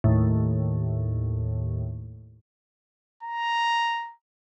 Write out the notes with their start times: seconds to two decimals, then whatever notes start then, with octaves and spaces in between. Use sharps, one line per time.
0.04 D#2 A2
3.23 A#5